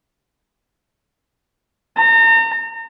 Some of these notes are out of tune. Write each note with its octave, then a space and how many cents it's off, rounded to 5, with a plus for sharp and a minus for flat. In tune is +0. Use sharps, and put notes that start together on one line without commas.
A#5 -35